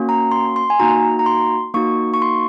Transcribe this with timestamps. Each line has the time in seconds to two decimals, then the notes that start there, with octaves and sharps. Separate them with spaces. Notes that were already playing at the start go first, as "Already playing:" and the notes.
Already playing: A#3 C#4 F#4
0.09 A#5
0.31 C6
0.56 C6
0.70 G#5
0.79 A#3 D#4 F#4 A#5
1.19 A#5
1.26 C6
1.74 A#3 D#4 F#4 C#6
2.14 C#6
2.22 C6